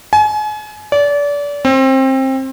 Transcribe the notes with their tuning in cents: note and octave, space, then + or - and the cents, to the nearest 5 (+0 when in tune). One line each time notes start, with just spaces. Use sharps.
G#5 +35
D5 -30
C4 +25